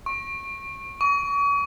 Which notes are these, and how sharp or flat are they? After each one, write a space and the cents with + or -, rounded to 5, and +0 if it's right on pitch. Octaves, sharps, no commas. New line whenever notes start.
C#6 -20
C#6 +40